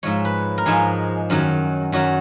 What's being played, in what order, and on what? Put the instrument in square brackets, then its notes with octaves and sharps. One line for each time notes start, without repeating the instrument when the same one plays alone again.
[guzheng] G#2 F3 G#3 C#5
B4
A#4
G#2 F3 G#3 G#4
F#2 D#3 F#3
F#2 D#3 F#3 F#4